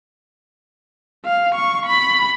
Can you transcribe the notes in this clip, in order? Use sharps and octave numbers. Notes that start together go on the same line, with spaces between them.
F5
C#6
B5